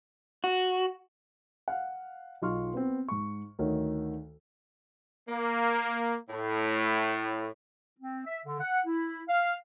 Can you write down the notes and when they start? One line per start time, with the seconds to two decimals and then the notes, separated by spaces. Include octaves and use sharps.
0.44 F#4
1.68 F5 F#5
2.42 B1 D#4 F4 C6 C#6 F6
2.74 B3 C4
3.09 G#2 C#6
3.59 D2 D#3 C#5
5.29 A#3
6.29 A2
7.99 C4
8.26 E5
8.46 D3
8.60 F#5
8.86 E4
9.28 F5